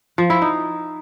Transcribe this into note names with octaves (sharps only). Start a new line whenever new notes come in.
F3
E4
D#4